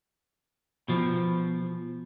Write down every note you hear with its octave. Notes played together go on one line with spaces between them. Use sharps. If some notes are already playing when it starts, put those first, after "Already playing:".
B2 F3